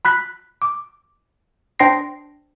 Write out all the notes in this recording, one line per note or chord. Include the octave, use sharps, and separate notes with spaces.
B5 F#6 B6
D6
D4 C5 G5 C6 A#6 C7